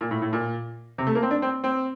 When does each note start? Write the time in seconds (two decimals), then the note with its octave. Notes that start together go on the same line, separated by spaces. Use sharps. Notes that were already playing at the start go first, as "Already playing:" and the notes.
0.01 A#2
0.11 A2
0.22 A2
0.33 A#2
0.98 C3
1.07 A3
1.15 A#3
1.23 C4
1.31 D4
1.42 C4
1.64 C4